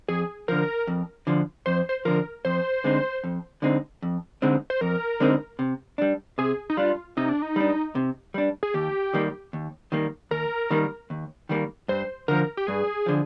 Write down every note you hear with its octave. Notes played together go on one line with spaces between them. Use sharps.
F2 G#4
D3 F3 A#4
F2
D3 F3
F2 C5
C5
D3 F3 A#4
F2 C5
D3 G#3 C4 D#4
F2
D3 G#3 C4 D#4
F2
D3 G#3 C4 D#4
C5
F2 A#4
D3 G#3 C4 D#4
C3
G3 D4
C3 G#4
D#4
G3 D4 F4
C3 D#4
D4
D#4
G3 D4
C3
G3 D4
G#4
D#2 G4
D#3 G3 A#3
D#2
D#3 G3 A#3
D#2 A#4
D#3 G3 A#3
D#2
D#3 G3 A#3
G2 C5
D3 F3 A#4
G4
G2 G#4
D3 F3